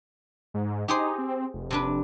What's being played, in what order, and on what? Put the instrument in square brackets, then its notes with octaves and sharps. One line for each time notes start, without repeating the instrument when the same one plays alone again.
[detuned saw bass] G#2
[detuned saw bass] D#4 [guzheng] G4 G#4 C5
[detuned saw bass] C4
F1
[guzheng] C3 D4 B4